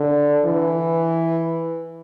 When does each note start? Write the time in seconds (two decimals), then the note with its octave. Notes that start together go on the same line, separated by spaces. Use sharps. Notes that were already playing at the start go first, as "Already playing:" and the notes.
Already playing: D3
0.46 E3